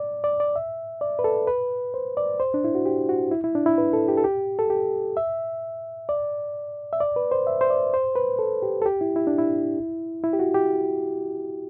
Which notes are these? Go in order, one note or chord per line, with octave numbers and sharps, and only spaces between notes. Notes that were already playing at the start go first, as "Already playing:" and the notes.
Already playing: D5
D5
D5
E5
D5
B4
A4
B4
C5
D5
C5
D4
E4
F#4
G4
F#4
E4
E4
D4
E4
B4
A4
G4
A4
G4
A4
G4
E5
D5
E5
D5
B4
C5
E5
C5
D5
C5
B4
A4
G4
A4
G4
E4
E4
D4
E4
E4
G4
F#4
G4